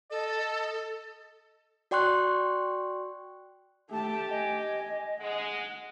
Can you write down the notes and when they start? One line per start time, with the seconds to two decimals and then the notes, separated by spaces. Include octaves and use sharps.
0.11 A4 D#5
1.91 F#4 D5 G5 C6 C#6 F#6
3.90 A3 G4 A5
4.30 D#5 G#5
5.21 G#3 F#5